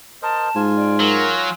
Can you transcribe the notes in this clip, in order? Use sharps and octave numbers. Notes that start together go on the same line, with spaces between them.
A#4 C5 D#5 A5
G#2 F4 G#5
D5
F#3 A#4